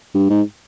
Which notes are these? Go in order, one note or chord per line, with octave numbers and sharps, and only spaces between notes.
G2
G#2